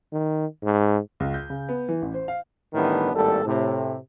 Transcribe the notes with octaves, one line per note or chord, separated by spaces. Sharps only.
D#3
G#2
C#2
G6
C#3
B3
E3
A1
C5
F5
A2 D#3 E3 G3 B3 D4
G#1 A2 G3 A#3 A4
A2 C3